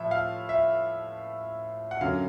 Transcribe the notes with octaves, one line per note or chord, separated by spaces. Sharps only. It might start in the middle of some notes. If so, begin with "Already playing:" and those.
Already playing: A2 F3 E5
F5
E5
F#5
F#2 D3 F#3 F5